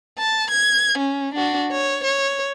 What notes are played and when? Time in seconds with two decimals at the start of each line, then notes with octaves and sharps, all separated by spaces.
0.19 A5
0.51 G#6
0.98 C#4
1.35 D4 F#4
1.71 C#5
2.04 C#5